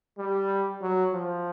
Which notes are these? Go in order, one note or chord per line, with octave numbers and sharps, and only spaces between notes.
G3
F#3
F3